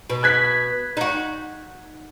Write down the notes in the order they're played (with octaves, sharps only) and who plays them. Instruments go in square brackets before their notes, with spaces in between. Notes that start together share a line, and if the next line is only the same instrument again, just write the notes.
[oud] B2
[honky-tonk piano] F#6 G#6 B6
[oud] D#4 F#4